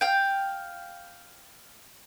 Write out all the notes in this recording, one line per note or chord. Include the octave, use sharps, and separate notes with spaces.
F5 G5